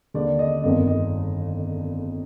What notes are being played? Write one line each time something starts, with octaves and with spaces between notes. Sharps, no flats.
D#2 D3 D5
D#5
G1 F2 D#3 D#5
D#5